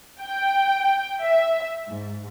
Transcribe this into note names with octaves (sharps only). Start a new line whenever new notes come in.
G5
E5
G#2